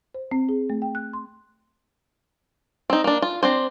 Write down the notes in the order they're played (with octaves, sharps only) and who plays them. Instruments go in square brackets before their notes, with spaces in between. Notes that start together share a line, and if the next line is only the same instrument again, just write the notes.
[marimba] C5
C4
G#4
A3
G5
F#6
C6
[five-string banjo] C4 D#4
A#3 D4
F4
C4 D4 C5